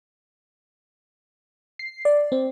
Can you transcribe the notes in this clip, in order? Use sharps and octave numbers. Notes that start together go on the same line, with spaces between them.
C7
D5
C4